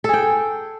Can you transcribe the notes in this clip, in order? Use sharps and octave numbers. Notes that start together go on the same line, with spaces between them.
G#4 A4 G5